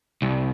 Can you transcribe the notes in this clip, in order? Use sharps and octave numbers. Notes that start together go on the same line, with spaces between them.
C2